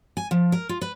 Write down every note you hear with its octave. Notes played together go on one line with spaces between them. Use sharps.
G#5
F3
A#4
F4
B4